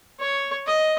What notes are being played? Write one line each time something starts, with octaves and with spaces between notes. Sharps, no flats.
C#5
D#5